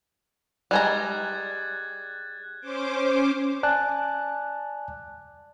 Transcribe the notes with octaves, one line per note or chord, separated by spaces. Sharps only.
G3 G#3 A#5 F#6 G#6 A6
C#4 C5 D6
D5 G#5 A5 F#6